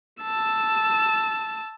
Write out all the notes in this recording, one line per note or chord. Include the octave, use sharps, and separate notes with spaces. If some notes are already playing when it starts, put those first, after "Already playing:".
A5 E6